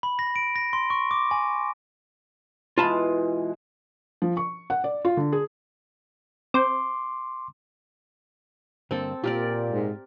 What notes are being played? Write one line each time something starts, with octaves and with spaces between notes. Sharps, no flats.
B5
A#6
D7
A#6
C6
C#6
D6
G#5
B2 E3 G#3 F4 A5 B5
F3
C#6
F#5
D5
F4
D3
G#4
C4 C6 D6
G2 D3 A#3 C4 A4
A#2 F4 G4 A#4 D5
G#2